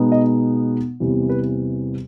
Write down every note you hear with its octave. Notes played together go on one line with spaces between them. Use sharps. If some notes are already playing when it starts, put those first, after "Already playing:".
Already playing: B2 G#3 B3 D#4
D#5
E2 C3 E3 G3
B4